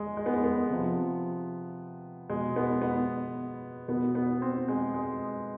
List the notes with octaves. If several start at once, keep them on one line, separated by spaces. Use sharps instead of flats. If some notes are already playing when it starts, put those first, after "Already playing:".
Already playing: G#3
G#3
B3
G#3
B3
C3 F3
B2 G#3
B3
B3
B2 B3
B3
C4
G#3
G#3